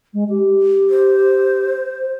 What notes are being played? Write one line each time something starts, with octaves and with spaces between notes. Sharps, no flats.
G#3
G4
C5